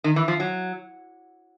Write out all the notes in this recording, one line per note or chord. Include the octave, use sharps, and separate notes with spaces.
D#3
E3
F3
F#3